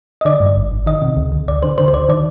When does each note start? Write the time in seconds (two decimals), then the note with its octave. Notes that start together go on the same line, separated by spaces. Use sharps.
0.21 D#5
0.25 D3 D5
0.40 G2
0.56 G#1
0.71 G#1
0.86 D#3 D#5
1.02 C3
1.17 D2
1.32 D2
1.48 D2 D5
1.63 D3 C5
1.78 D3 C5
1.88 C5
1.93 D2 D5
2.09 D#3 D5